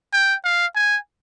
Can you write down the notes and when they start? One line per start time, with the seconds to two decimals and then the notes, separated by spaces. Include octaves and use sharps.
0.13 G5
0.45 F5
0.75 G#5